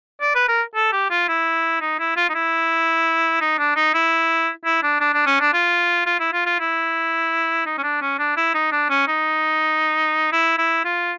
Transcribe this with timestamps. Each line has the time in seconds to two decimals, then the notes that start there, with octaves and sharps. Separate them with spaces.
0.21 D5
0.35 B4
0.48 A#4
0.75 A4
0.92 G4
1.11 F4
1.28 E4
1.81 D#4
1.99 E4
2.17 F4
2.30 D#4
2.35 E4
3.41 D#4
3.59 D4
3.76 D#4
3.94 E4
4.65 E4
4.83 D4
5.01 D4
5.14 D4
5.27 C#4
5.40 D4
5.54 F4
6.06 F4
6.20 E4
6.33 F4
6.46 F4
6.60 E4
7.66 D#4
7.78 C#4
7.83 D4
8.02 C#4
8.19 D4
8.37 E4
8.55 D#4
8.72 D4
8.90 C#4
9.08 D#4
10.32 E4
10.58 E4
10.85 F4